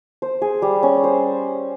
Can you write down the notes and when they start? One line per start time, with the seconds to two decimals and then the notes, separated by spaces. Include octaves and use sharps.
0.22 C5
0.42 G#4
0.62 G3
0.83 C#4
1.04 C5